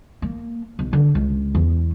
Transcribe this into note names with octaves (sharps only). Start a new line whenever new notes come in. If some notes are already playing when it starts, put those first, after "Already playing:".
A#3
B1
D3
C#2
E2